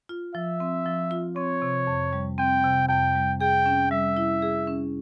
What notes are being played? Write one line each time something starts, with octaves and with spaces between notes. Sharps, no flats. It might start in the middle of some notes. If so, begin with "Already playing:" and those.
F4
F3 E5
C4
F3
F4
C4 C#5
C3
F2
G3
C4 G5
C3
F2 G5
G3
G#4 G5
C#4
G3 E5
E4
G#4
C#4